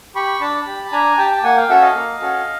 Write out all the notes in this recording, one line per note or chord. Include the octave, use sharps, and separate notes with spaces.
G4 B5 C#6
D4 A5 B5
G4
D4 G#5 A#5
G4 G5 A5
A5
A#3 F#5 G#5
F5 G5
C#4 F#4 A4 E5 F#5
D#5 F5
A#3
C#4 F#4 A4